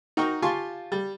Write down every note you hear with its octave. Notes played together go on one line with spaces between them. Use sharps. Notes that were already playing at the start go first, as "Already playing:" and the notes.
D#4 F#4 A#4 G5 C#6
F4 G4 G#5 A5 C6 C#6
G3